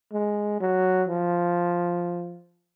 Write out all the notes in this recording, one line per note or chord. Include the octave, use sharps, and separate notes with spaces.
G#3
F#3
F3